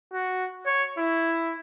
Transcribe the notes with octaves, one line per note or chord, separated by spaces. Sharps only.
F#4
C#5
E4